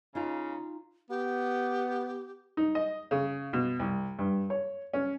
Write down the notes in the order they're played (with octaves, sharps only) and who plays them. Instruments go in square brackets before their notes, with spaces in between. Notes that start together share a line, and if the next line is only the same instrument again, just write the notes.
[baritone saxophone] C#3 [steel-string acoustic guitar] D#4 F4 A#5
[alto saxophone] B3 [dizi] G4
[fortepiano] D#4
D#5
C#3
B2
C2
G2
C#5
C#4